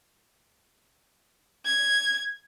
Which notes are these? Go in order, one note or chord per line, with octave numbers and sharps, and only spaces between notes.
G#6